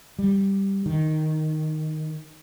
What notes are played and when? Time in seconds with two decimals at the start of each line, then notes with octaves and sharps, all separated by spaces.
0.19 G3
0.86 D#3